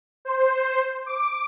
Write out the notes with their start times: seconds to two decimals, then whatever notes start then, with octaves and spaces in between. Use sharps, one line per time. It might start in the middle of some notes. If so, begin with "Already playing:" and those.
0.25 C5
1.06 D6